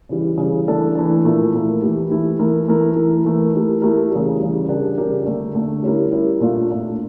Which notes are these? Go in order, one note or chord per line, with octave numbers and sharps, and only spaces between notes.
C#3 E3 G3
C#3 E3 G3
E3 A3 D4 A4
E3 A3 D4 A4
A#2 F3 A3 E4 A#4
A#2 F3 A3 E4 A#4
E3 A3 E4 G4
E3 A3 E4 G4
E3 A3 E4 A#4
E3 A3 E4 A#4
E3 A3 E4 A#4
E3 A3 E4 A#4
A3 E4 G4 A#4
A3 E4 G4 A#4
C#3 E3 G3
C#3 E3 G3
C#3 G3 D4 G4 A#4
C#3 G3 D4 G4 A#4
D3 A3 D4
D3 A3 D4
G3 C#4 E4 G4 A#4
G3 C#4 E4 G4 A#4
A#2 A3 D4 F4
A#2 A3 D4 F4